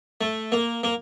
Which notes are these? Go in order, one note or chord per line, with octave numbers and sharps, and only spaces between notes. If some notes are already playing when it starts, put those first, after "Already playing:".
A3
A#3
A#3